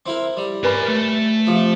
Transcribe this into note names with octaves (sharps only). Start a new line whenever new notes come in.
C4 E4 A#4
G3
A#4 B4 C#5 G#5 B5
A3
C3 F3